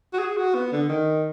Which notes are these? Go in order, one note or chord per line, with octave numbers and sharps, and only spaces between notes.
F#4
G#4
F#4
B3
D3
D#3